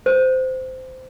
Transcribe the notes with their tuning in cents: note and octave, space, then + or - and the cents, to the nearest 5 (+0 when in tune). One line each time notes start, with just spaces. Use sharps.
C5 -15